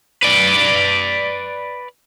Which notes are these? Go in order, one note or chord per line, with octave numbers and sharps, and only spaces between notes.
B4 D5